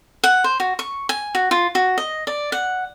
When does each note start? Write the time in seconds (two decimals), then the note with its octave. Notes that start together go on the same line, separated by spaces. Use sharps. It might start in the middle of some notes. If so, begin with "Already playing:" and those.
0.24 F#5
0.44 C5
0.60 F#4
0.79 C#6
1.09 G#5
1.35 F#4
1.51 F4
1.75 F#4
1.98 D#5
2.27 D5
2.52 F#5